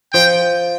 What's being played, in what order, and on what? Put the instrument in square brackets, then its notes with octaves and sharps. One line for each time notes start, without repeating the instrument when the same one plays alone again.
[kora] F3 [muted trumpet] G5